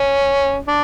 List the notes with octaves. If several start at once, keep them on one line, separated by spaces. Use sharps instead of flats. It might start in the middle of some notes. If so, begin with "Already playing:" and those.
Already playing: C#4
D4